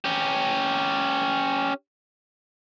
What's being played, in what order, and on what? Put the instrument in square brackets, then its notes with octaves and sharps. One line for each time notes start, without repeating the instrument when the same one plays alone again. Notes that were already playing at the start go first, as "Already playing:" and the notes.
[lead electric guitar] C#4 G4